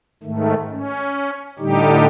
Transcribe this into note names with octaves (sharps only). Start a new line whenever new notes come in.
G#2 D#3 A3
C#4
A2 D3 G3 D#4 G4